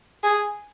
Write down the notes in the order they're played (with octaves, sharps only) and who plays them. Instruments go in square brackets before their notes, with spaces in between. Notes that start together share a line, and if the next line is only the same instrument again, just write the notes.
[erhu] G#4